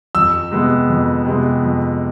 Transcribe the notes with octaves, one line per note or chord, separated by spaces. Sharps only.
F2 E6
C3 G#3 B3
F2
C3 G#3 B3
F2